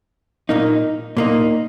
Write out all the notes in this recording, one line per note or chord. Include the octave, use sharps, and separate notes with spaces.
A#2 A#3 D#4
A#2 A#3 D#4